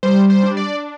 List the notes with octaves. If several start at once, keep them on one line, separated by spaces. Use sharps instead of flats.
G3 C5
C5
D4
D5